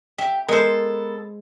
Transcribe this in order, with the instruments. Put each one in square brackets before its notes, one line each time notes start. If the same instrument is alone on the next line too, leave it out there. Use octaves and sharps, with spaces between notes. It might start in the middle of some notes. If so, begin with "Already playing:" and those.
[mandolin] G4 [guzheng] E5
[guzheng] G#3 C5 [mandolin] B3 A4 [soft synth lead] A#4